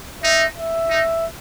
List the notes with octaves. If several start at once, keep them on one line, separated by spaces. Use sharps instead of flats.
D#4 E5
E5
D#4